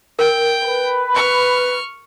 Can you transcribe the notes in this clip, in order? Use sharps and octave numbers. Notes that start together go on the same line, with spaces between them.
A#4 G5
B4
C#6 F6